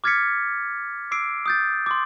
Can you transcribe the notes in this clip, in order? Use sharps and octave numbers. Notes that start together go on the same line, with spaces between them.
D6 F6 G#6 A6 B6 C#7
D6 E6 C7 D7
D#6 G6 A6
C6 D6